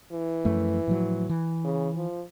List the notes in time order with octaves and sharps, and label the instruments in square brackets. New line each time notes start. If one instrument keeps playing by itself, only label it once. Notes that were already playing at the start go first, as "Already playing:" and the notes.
[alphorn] E3
[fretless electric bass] F#2 F3 A3
A2 F3 F#3
E3
[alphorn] C#3
F3